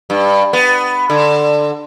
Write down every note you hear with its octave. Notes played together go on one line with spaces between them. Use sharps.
G2
B3
D3